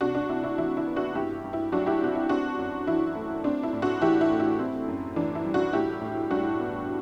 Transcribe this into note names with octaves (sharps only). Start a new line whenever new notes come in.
C3 D4 F#4
D4
C3 E4
E4
E3 E4
E4
B3
D4 F#4
G2 E4 G4
G2
E4
F#3 D4 F#4
E4 G4
C4 F#4
E4
C4 D4 F#4
F#2
E3 E4
A3
C4 D4
E4
A2
D4 F#4
E3 E4 G4
E4
A3
E4
C4
F#2
E3 D4
E4
G3
D4 F#4
A2 E4 G4
A2
G3 D4 F#4
B3